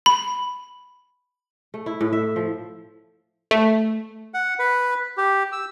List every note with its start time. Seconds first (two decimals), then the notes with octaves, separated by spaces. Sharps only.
0.06 B5
1.74 A3
1.86 E4
2.01 A2
2.13 E5
2.36 F3
3.51 A3
4.34 F#5
4.59 B4
5.17 G4
5.52 E6